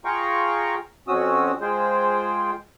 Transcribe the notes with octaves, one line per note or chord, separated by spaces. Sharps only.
F4 G#4 F5 G5 A#5 C#6
F2 C4 C#4 F#4 D#6 E6
G#3 F4 G#4 C5 G5